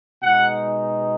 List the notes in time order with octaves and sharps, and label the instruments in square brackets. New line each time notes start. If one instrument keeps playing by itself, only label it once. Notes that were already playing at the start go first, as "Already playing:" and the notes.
[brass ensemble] B2 G#3 D#4 F#5